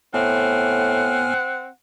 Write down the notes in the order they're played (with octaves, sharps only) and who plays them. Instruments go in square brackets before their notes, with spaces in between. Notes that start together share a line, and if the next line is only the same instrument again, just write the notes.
[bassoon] A2 [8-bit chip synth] B3 G#5 F6 [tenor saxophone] C4 [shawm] F#5